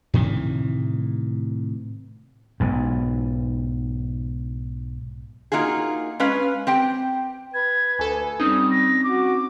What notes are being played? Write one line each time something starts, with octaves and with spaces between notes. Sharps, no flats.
A2 C3 D#3 E3
B1 G#2
A#3 D#4 F4 F#4 G#4
G#3 C#4 B4 F5
C4 G4 G5
B4 G#6
D2 A4 G#5
G3 C4 C#4 D#4 D#6
A#6
F#4 D6